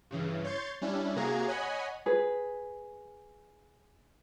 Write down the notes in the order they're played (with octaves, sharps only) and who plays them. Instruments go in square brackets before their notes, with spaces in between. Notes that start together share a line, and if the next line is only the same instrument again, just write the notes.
[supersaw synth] G2 C#3 E3
C#5 C6 G6 A6
G3 C#4 D4 E4
C3 A#3 F#4 G#4 A#5 G#6
C#5 D#5 F#5 G#5 B5
[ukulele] G#4 B4